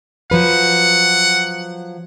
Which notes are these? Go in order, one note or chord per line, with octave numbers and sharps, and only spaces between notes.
F3 F#3 B4 F#5